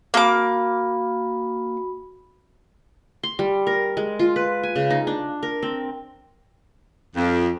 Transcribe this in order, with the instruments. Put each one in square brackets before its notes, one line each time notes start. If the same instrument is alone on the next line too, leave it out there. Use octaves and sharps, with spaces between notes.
[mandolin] A#3 D6 [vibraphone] F#4 B5
[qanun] C6
G3
A#4
G#3
F4
B4
G#5
C#3
D#4
D4
A#4
C4
[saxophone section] F2